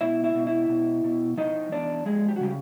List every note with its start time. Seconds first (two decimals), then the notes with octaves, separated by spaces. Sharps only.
0.01 B2 E4 E5
0.24 E4 E5
0.35 B2
0.47 E4 E5
0.69 B2
1.04 B2
1.37 F3 D#4 D#5
1.72 E2 D4 D5
2.06 F3 G#3 G#4
2.29 G4
2.36 F#4
2.41 C#3 G3 G4